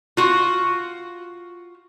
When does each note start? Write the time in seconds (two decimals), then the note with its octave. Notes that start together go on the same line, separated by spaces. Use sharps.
0.17 F4 F#4